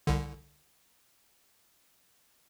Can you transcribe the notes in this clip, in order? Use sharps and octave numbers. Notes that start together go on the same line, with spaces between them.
C2 D3